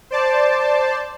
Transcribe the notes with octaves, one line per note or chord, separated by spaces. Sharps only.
C5 D5 A5